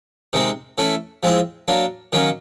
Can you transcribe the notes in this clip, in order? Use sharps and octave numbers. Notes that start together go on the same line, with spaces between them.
C3 D#3 G#3 C4
E3 A3 C#4 E4
F3 G#3 C4 E4
F#3 A#3 D4
D#3 F#3 A#3 C#4